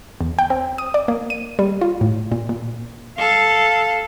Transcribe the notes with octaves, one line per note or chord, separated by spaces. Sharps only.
E2
G5
C4
D#6
D5
A#3
D#7
G3
F4
A2
A#2
A#2
A4 F5